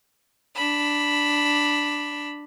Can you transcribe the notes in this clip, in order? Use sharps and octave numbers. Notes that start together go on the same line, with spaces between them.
D4 B5